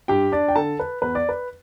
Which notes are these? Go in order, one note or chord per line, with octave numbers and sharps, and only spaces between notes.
G2 G4 G5
D4 D5
G5
D3 A4 A5
B4
E2 B4
D5
B4